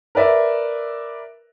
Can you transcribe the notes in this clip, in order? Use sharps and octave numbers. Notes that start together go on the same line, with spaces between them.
A#4 B4 D5 E5